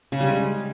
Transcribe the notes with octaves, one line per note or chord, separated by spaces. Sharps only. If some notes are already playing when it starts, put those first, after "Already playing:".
C#3
G3
G#3